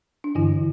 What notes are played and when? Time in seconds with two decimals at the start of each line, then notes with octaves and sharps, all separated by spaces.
0.24 D4
0.35 G2 D3 E3 E4